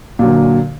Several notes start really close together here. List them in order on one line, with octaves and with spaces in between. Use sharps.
A#2 F#3 D3